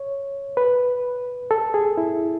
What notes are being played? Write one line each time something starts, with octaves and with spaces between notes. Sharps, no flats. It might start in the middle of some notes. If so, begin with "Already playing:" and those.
Already playing: C#5
B4
A4
G#4
E4